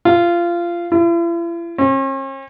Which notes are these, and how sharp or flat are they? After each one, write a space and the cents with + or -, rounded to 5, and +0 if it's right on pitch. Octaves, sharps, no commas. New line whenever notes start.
F4 -20
E4 +45
C#4 -45